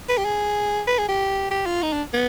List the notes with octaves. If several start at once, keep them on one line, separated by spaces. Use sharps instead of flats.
B4
G4
G#4
B4
G#4
G4
G4
F4
D#4
D4
B3